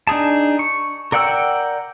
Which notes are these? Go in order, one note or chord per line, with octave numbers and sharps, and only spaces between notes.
D4 D#4 G#4 A5
C#6
A#4 D5 F#5 G5 E6